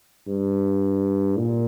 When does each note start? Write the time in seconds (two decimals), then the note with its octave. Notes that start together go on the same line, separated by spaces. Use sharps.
0.27 G2
1.38 A#2